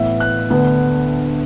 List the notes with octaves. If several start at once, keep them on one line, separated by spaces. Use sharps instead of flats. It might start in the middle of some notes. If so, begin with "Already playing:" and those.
Already playing: A2 E3 B3 E5
F#6
D2 D3 B3